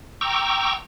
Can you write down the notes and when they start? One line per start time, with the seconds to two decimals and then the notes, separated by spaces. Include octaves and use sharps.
0.21 G5 A#5 C#6 D6 E6